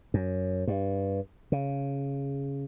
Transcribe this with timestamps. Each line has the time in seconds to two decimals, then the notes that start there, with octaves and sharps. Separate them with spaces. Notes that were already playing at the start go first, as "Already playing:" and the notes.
0.14 F#2
0.67 G2
1.52 C#3